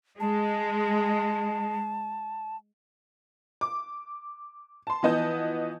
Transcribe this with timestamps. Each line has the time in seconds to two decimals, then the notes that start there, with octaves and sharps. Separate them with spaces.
0.20 G#3 A5
3.61 D6
4.87 A5 C6
5.03 E3 F3 B3 D#5 A5 G6